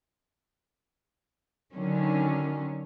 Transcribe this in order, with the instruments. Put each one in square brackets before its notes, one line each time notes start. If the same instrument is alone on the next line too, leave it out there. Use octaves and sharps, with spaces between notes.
[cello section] D3 D#3 F#3 C#4